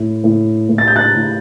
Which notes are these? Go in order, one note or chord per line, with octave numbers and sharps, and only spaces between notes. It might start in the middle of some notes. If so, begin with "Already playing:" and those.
Already playing: A2
A2
A2
A6
G6
F#6 A6
A2